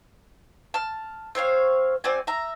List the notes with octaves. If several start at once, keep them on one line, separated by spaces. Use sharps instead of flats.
A5 F6
C4 C5 C#5 F5
C4 F#4 D5 G#5
E5 A#5